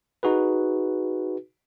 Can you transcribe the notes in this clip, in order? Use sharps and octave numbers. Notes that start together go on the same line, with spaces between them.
D#4 F#4 G#4 B4